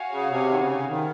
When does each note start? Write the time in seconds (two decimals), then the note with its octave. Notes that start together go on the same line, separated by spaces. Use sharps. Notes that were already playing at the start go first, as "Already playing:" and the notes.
Already playing: F#4 C#5 F5 G#5
0.12 C#3
0.31 C3
0.50 D#3
0.59 C#3
0.88 D#3